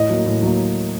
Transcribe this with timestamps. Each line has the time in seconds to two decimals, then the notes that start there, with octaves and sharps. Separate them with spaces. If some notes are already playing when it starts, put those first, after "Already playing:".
Already playing: A2 D#5
0.10 F#3 A#3
0.26 A2
0.42 F#3 A#3